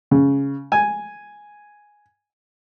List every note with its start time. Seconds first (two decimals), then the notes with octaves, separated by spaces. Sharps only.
0.11 C#3
0.72 G#5